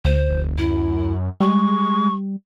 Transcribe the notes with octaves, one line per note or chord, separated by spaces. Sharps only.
D2 C5
F1
F#2 E4
G3 G#3 C#6